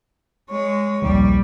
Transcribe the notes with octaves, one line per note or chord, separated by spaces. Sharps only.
G#3 C#5
A#1 D#2 D#3 G3